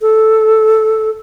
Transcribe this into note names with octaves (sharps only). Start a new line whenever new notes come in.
A4